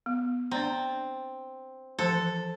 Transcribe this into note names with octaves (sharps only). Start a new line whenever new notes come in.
B3
C4 D4 D5 A#5
E3 F3 A4 C5